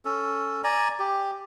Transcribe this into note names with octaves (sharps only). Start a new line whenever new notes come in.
C#4 A4
D5 G#5 A#5
G4